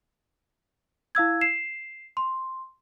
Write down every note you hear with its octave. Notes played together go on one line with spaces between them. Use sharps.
E4 F5 E6 G#6
C7 E7
C6